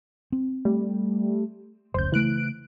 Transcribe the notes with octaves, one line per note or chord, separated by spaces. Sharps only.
C4
G3 A3
F1 C#2 C5 G6
C#3 E3 A3 F#6 D7